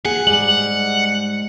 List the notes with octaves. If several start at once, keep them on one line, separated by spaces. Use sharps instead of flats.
A#2 G#4 F#5
G#2 G3 G#3 F#7